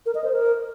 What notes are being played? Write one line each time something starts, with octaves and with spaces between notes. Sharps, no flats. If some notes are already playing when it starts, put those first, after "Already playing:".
A#4
D#5
C5
A#4